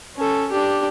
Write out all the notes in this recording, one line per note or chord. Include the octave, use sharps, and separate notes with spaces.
C#4 A4
D4 G4